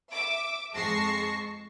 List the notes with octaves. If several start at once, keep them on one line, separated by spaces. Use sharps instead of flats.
E5 D6
F2 G#3 A5 C#6 A#6 C7